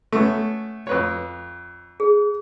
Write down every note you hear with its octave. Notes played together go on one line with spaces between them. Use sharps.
A3 B3 C#4
F2 B4 C#5
G#4